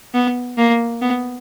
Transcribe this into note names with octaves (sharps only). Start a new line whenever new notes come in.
B3
A#3
B3